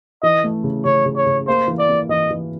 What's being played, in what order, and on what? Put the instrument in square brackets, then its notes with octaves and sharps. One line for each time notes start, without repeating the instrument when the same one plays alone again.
[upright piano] E3 [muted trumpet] D#5
[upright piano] A3
C#3
[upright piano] C#3 [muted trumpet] C#5
[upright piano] C#3
[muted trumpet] C#5
[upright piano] C#3
[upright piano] A#3 [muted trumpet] C5
[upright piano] E3
[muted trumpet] D5
[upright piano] A#3
[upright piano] E3 [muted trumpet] D#5
[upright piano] E3